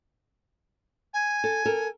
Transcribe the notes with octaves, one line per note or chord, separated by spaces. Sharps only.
G#5
A4
A4 A#4